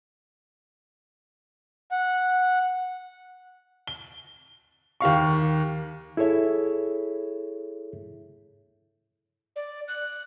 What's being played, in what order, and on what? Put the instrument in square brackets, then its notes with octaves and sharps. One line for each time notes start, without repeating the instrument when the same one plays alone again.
[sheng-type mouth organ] F#5
[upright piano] G7
D#2 G4 F5 C#6
[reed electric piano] E4 G#4 A4 C#5 E5
[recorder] D5
F#6